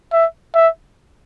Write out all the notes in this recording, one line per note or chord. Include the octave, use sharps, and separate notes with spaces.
E5
E5